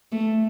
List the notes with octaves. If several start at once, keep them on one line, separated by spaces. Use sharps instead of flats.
A3